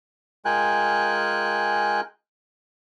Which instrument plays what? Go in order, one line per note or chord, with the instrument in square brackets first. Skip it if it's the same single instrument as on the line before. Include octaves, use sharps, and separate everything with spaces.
[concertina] G#3 F4 A#4 G5 G#5 F#6